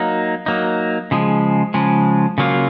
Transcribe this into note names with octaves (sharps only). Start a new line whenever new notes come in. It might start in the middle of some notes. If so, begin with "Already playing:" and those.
Already playing: F#3 A#3 D#4
F#3 A#3 D#4
C#3 F3 G#3
C#3 F3 G#3
C#3 F#3 A#3 F4